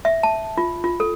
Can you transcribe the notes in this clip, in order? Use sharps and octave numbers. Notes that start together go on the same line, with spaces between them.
E5
A5
F4
F4
A4